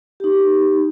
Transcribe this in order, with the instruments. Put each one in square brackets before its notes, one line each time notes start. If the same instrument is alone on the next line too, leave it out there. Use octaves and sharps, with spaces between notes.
[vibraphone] D#4 G4